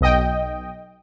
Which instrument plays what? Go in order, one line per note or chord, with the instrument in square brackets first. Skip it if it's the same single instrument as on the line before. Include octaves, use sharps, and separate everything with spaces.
[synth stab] B1 D#5 G5